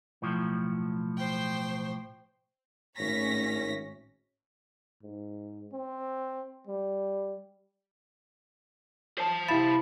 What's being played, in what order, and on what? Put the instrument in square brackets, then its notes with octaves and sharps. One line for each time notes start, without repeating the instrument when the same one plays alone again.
[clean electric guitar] B1 A2 F3
[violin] C5 G5
[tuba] G#1 [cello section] A2 C#4 [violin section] C#5 A#6 B6
[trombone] G#2
C4
G3
[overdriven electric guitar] C5 A5
[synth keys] C3 E4 B5 [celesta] F5 A6 E7